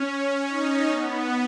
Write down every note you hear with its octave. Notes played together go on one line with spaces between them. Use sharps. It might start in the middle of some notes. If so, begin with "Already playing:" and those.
Already playing: C#4
D#4
B3